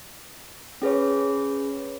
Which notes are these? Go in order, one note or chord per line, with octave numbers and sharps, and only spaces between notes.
C#4 G#4 B4 C#5